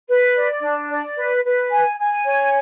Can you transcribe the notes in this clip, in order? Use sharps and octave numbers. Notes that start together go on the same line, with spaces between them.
B4
D5
D4
D5
B4
B4
G#5
G#5
C#5